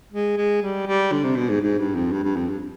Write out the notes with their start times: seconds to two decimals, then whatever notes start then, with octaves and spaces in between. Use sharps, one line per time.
0.12 G#3
0.37 G#3
0.62 G3
0.87 G3
1.12 D3
1.24 C3
1.36 B2
1.49 G#2
1.61 G#2
1.78 G2
1.95 F2
2.11 G2
2.24 G2
2.36 F2
2.49 G2